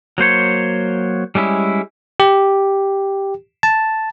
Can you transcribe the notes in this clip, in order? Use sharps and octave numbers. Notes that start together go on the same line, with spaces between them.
F#3 A#3 C5 C#5
G3 G#3 C#4 E4
G4
A5